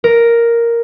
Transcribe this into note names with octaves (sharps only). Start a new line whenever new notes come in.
A#4